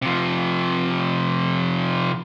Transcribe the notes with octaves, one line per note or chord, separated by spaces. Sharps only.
C3 F3